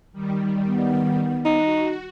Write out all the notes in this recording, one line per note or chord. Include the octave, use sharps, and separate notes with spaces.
D#3 G3
B3
D#4 F#4